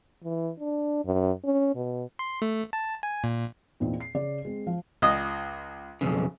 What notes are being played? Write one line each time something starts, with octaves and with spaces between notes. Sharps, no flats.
E3
D4
F#2
C#4
B2
C6
A3
A5
G#5
A#2
E2 A#2 C4 D#4
C7
C#3 D5
G#3 C4
F3 F5
C#2 D#5 D#6
B1 F2 C#3